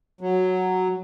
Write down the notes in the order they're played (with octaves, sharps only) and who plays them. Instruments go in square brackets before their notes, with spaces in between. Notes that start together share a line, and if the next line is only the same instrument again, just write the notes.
[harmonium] F#3